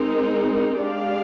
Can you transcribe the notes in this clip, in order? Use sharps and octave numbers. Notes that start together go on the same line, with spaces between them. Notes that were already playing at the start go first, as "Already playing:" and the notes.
Already playing: G#3 C4 D#4 A#4
G#3 D4 G4 D5 F5